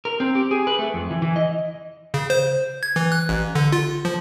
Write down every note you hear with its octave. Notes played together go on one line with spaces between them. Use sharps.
A#4
C4
G4
G#4
B4
A3
F2
E3
E3
D#5
C#3
C5
G#6
E3
F#6
A1
D3
F4
F3